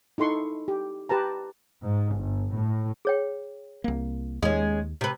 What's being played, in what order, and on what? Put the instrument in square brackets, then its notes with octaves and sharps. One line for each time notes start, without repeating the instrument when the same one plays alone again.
[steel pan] D#4 E4 A4 C6 C#6
G4
G4 B4 A5 A#5
[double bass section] G#2
G1
A2
[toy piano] G#4 C#5 G5
[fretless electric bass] C2 A#3
[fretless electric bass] D#2 [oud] G#3 C#4
[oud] C3 B4